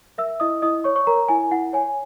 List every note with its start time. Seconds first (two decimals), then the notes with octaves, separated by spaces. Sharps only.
0.18 A#4 E5 E6
0.40 E4 D#5 D#6
0.62 E4 D#5 D#6
0.84 C#5 C#6
0.96 C#5 C#6
1.07 A#4 A#5
1.28 E4 G#5
1.51 E4 F#5
1.73 C#5 G#5